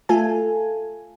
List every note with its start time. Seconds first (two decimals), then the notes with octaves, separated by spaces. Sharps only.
0.09 A3 F4 A4 G#5